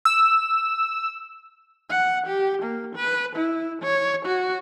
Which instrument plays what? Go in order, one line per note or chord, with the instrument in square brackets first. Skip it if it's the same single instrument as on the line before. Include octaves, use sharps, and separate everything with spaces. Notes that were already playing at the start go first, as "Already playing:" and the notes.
[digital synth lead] E6
[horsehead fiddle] F#5
G4
A#3
B4
E4
C#5
F#4